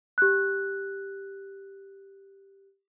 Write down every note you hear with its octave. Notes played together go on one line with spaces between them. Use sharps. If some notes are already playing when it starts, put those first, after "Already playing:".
G4 F#6